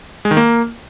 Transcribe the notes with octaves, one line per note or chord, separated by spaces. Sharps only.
G#3
D#3
A#3